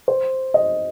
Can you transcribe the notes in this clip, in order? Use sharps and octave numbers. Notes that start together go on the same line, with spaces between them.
C5
D#5